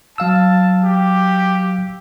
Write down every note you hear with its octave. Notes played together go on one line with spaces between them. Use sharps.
F#3 F5 A5 E6
G4